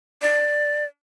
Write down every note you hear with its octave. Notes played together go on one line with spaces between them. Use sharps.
D5